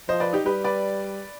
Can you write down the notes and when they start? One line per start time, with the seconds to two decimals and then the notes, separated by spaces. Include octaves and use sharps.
0.08 F3 C5 D#5
0.20 B4 D5
0.33 D#4 G4
0.46 G3 G4 B4
0.64 B4 D5